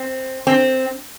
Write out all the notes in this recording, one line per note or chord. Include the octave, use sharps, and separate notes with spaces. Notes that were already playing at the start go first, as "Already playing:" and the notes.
Already playing: C4
C4